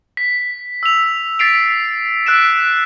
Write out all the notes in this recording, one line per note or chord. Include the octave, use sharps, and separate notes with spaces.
B6
E6 F7
A6 B6 C7 D7 F7
E6 F#6 B6 D7 E7